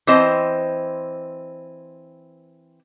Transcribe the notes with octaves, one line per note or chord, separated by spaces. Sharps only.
E3 C4 C5 D#5